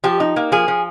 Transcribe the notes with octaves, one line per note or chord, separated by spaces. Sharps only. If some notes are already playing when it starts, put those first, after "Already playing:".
F3 G4
D#4
A#3
F3 G#4
F3